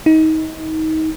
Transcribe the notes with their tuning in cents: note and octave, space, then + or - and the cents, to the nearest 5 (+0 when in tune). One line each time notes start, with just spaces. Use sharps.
D#4 +25